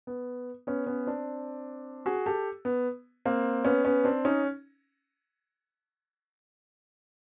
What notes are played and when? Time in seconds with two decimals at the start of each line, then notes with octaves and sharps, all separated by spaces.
0.07 B3
0.67 B3 C#4
0.86 B3 C#4
1.07 C4 D4
2.06 F#4 G#4
2.26 G4 A4
2.65 B3
3.25 A#3 C4
3.65 B3 C#4
3.85 B3 C#4
4.04 C4 D4
4.25 C#4 D#4